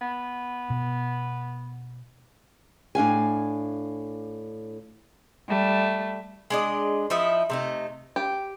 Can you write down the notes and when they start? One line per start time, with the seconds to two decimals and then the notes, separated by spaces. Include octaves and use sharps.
0.01 B3
0.70 B2
2.95 A2 D4 F5 G#5
5.46 G3 A3
6.50 G#3 D4 D#5
7.10 F3 D#4 E4 E5
7.50 C3 A3 D#4
8.16 G4